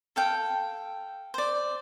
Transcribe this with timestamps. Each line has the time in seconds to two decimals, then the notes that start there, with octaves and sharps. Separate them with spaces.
0.16 A4 F5 G5
1.34 C5 D5